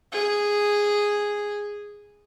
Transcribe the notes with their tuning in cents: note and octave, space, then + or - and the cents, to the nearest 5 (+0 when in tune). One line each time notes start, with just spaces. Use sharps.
G#4 -5